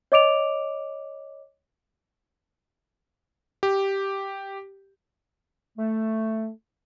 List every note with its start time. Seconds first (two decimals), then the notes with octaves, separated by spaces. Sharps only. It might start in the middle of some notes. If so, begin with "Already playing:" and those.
0.12 C#5 D#5 D6 D7 F7
3.63 G4
5.78 A3